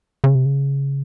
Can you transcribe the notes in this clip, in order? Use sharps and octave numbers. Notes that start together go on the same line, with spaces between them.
C#3
C3
C#3